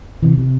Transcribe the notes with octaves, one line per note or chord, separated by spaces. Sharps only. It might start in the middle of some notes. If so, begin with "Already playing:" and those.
C3 E3
C3